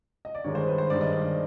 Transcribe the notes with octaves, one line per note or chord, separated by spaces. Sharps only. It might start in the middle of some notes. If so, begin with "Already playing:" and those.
D#5
D5
G2 D#3 G#3 C#5
C5
B4
C5
G2 D#3 G#3 D5
D#5
D5